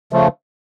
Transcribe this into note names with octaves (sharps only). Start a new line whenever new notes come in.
C#3 F3 A3